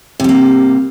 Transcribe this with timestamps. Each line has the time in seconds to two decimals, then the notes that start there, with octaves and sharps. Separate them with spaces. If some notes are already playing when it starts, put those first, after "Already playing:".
0.20 C3
0.24 G3
0.29 A#3